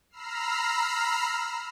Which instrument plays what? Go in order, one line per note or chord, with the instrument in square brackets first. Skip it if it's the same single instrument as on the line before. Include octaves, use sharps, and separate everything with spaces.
[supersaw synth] A#5 B5 E6 F6 C7